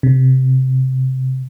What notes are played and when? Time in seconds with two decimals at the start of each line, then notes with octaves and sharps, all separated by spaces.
0.03 C3